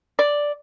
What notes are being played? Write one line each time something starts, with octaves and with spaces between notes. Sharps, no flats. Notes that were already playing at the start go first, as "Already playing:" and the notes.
D5